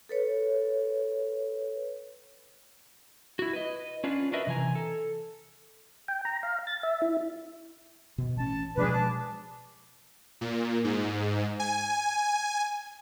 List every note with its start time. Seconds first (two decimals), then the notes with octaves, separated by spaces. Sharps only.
0.09 A4 B4 C#5
3.39 E4 F#4
3.53 B4 D#5
4.04 C#4 D4 F4 B4
4.32 D4 F#4 A#4 B4 D#5 E5
4.47 C3 E3 D5 G#5 A#5
4.75 A4
6.08 G5
6.25 A#5
6.43 F5
6.67 A6
6.83 E5
7.02 E4
8.18 B2
8.37 A1 C#4 A5
8.77 B2 F3 G#3 D4 G#4 B4
8.92 A5 D6
10.41 A#2
10.84 G#2
11.60 G#5